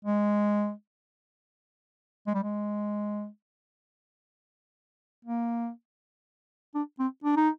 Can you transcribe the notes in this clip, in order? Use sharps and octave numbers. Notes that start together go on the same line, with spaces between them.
G#3
G#3
G3
G#3
A#3
D4
C4
D4
D#4